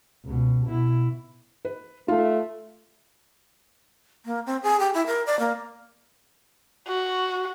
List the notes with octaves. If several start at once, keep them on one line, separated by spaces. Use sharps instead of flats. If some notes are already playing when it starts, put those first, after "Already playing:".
C#2 B2
B2 E4
B4
A3 F4 F5
A#3
C4
G#4
G4
E4
A#4
D5
A#3
F#4